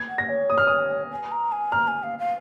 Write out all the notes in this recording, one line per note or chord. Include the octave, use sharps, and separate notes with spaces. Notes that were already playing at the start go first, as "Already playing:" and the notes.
Already playing: G#6
F#5
A#6
C#5
D#6
F6
D#6
G#5
A#5
G#5
A#5 F6
G#5
F5
F5